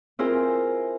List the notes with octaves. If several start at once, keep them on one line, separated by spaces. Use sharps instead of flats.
C4 E4 F4 G#4 A#4 C5